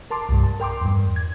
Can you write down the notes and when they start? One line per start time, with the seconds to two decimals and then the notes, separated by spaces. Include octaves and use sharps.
0.11 A#4 A5 C6 D6
0.29 C2 G2
0.43 A5
0.60 A#4 G5 C6 D6
0.81 E2 G2
1.16 G#6